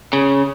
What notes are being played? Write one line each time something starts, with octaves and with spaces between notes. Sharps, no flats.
C#3